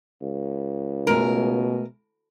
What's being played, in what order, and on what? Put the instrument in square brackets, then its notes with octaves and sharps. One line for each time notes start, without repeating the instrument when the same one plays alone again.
[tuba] C#2
[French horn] B2 [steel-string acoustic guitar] G#3 A3 G#5 [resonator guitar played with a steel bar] A#4